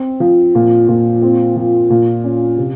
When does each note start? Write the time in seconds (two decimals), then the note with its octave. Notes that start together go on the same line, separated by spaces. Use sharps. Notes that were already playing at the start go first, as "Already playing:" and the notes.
Already playing: C4
0.20 F3
0.55 A#2
0.89 A#2
1.22 C4
1.56 F3
1.90 A#2
2.24 C#4
2.58 C3